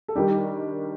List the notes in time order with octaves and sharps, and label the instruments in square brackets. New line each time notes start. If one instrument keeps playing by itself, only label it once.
[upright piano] A4
[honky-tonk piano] D#3 G3 D4 [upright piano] G4